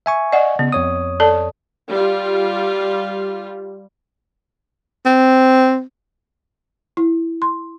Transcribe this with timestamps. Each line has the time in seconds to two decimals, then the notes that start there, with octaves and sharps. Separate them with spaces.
0.06 E5 G#5 C#6
0.32 D5 D#5 F#5
0.59 C#3 B3
0.72 F2 C#5 D#6
1.20 A4 D5 A5
1.90 G3 F4
5.06 C4
6.97 E4
7.42 C6